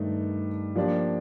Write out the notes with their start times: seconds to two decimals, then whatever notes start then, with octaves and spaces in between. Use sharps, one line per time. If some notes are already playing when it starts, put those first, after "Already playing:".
Already playing: G2 D#3 A3 D#4
0.75 F3 A#3 D4 G4 D5